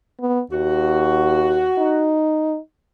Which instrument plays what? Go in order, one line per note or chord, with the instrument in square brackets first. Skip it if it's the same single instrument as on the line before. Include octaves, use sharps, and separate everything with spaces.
[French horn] B3
[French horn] D#2 [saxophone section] F#4
[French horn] D#4